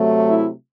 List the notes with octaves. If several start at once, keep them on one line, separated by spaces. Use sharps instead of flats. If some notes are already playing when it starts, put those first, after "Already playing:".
Already playing: C3 F#3 A3
E4